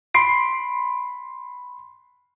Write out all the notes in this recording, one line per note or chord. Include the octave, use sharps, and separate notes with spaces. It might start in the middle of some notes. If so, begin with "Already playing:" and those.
B5 C6 C7 D7